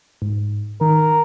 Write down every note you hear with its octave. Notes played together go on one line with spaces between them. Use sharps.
G#2
D#3 A#4